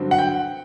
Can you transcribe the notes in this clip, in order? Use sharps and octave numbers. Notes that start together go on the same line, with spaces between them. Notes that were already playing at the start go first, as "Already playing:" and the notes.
Already playing: G2 D3 F#3 C4 F#4
F#5
G5